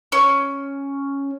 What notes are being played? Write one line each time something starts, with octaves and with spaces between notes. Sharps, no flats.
C#4